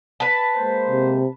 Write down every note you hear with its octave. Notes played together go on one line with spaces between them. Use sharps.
B4 A5
G#3 A#3 C5
C3